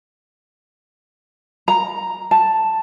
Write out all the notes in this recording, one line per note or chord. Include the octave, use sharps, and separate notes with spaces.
A#5
A5